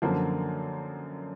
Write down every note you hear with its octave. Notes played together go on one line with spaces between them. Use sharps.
F#2 D3 F3 A#3